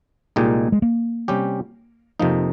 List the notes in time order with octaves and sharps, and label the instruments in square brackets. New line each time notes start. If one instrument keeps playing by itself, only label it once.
[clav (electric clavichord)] C2 A#2 G#3 D#4 G4
[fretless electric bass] G#3
A#3
[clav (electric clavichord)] C3 G3 C#4 G4
F2 C3 F3 A#3 D#4